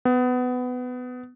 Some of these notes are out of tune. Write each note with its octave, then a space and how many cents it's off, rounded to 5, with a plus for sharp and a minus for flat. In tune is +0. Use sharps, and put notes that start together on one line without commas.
B3 +20